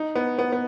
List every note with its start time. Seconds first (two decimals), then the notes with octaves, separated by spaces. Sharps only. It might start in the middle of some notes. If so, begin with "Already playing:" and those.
Already playing: D#4
0.16 B3
0.39 B3
0.52 B3